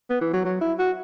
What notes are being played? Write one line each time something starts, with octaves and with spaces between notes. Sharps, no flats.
B3
E3
F#3
F#3
E4
F#4